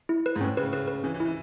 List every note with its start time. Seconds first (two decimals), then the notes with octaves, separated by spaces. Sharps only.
0.09 E4
0.26 B4
0.36 G#2
0.40 A2 C#4
0.57 C#3 B4
0.72 C#3 B4
0.88 B4
1.04 E3 C#4
1.14 E3
1.20 E4
1.25 E3